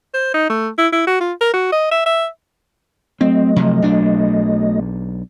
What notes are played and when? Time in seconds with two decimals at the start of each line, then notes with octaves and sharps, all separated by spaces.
0.14 C5
0.34 D#4
0.49 A3
0.78 E4
0.93 E4
1.07 F#4
1.21 F4
1.41 A#4
1.54 F#4
1.72 D#5
1.91 E5
2.06 E5
3.21 F#3 A3 C4 D#5
3.56 C3 F3
3.82 B1 D4